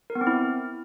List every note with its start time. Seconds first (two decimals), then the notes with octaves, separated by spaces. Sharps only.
0.10 A#4
0.15 B3
0.21 C4
0.27 E4